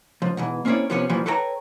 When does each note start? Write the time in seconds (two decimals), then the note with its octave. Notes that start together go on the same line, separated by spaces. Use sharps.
0.22 C#2 F3
0.37 G#2 B2 E3
0.65 A#3 C4 C#4 E4 C#5 D5
0.90 C3 F3 B3 C#4 A#4 C#5
1.09 F#2 A#2 E3 F3 G3
1.26 A4 B4 C#5 G5 G#5 A#5